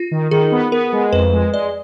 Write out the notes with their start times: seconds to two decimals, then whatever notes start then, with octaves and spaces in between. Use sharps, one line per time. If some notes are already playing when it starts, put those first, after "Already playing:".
Already playing: F4
0.11 D#3
0.31 D#3 G#4
0.52 B3
0.72 B3 A#4
0.93 G#3
1.12 F2 B4
1.33 G#3
1.54 G#3 D5